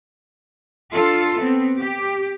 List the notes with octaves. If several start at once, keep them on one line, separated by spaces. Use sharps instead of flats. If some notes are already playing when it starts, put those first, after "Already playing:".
D4 F4 A4
B3 C4
G4